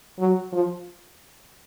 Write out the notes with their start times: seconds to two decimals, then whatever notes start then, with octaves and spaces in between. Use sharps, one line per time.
0.19 F#3
0.52 F3